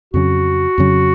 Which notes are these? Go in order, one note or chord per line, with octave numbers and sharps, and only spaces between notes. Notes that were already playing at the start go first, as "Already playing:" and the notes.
F2 C#3 F#3 C#4 F#4
F2 C#3 F#3 C#4